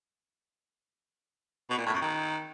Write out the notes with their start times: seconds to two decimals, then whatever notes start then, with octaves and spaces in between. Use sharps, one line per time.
1.70 B2
1.78 A#2
1.86 A2
1.93 F#2
2.01 D#3